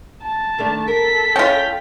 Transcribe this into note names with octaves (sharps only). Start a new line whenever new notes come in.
A5
D#3 A3 D4
A4 A#4 B6
C#4 F4 G5